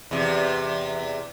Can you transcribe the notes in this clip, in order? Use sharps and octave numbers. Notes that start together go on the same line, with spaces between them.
E2 C3